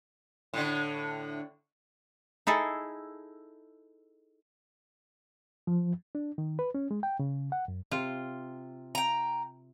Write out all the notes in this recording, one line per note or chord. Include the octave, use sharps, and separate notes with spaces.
A2 D3
D#4 E4 G#4 A4
F3
D4
D#3
B4
C#4
G#3
G5
C#3
F#5
F#2
C3 F4
G5 A#5